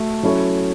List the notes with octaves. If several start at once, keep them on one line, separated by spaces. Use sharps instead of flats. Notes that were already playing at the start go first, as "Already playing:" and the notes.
Already playing: A3 F#4
F#3 C#4 E4 A4 C#5